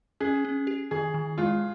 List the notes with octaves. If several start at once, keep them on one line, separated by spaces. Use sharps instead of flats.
C#4 G#4
C#4
G4
D#3 G#4
D#3
G#3 F4